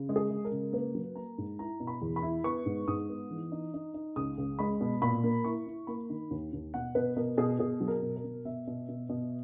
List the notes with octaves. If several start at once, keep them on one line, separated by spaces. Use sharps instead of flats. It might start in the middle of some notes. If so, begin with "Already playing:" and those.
Already playing: C#3
G#3
G#4
G#3
A#4
C#3
A#3 B4
F#3
A#3 A#5
G#2
E4 A#5
B2
B5
E2
B5
E4
B3 C#6
G#2
G#2 D#6
B3
E3
D#4
D#4
D#4
C#2 D#6
C#2
G#3 B5
B2
A#2 B5
A#3
E4 C#6
E4
A#3 B5
D#3
D#2
D#2
B2 F#5
B2 B4
B2 A#4
B2 G#4
B2 G#4
F#3
A#4
B2
A#4
B2
B2 E5
B2
B2
B2